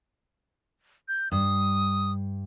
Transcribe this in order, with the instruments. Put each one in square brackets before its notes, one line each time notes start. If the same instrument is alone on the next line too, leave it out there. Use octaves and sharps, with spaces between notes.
[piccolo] G6
[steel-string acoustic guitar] G2 [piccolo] D#6